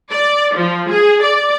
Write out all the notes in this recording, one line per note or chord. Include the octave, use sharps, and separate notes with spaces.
D5
F3
G#4
D5